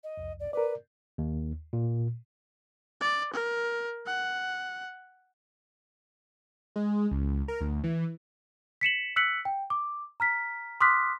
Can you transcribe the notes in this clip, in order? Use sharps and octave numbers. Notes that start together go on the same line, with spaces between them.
D#5
C2 F2
D5
A#4 B4 D5
D#2
A#2
D5
A#4
F#5
G#3
C#2
A#4
D2
E3
B6 C#7 E7 F#7
E6 F#6 B6 C#7 F#7
G5
D6
A#5 F6 B6
C6 D6 D#6 F6 F#6 B6